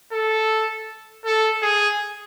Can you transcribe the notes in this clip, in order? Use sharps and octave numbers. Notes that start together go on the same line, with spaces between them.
A4
A4
G#4